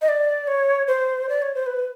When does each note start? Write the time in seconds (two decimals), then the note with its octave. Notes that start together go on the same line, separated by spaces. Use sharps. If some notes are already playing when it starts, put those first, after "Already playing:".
0.02 D#5
0.08 D5
0.47 C#5
0.87 C5
1.29 D5
1.42 C#5
1.55 C5
1.66 B4